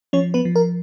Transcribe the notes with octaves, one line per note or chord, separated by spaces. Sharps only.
F3 C#4 C#5
B3 B4
F3
A#4